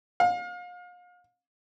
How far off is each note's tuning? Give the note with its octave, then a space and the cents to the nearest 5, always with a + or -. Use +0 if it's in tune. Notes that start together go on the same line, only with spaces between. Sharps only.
F5 +35